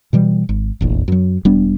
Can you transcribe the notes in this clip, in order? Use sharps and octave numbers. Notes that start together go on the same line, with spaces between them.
B2 E3 G3
G#1
F1 A#1 E2
F#2 F#3
E1 G3 B3 D4